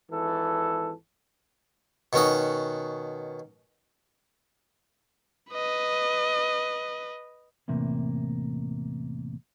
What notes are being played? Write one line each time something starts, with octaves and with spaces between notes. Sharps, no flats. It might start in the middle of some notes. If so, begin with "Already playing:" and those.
G#1 E3 A4
B2 D#3 C#4 F#4 D#6
B4 D#5
E2 A2 C3 A#3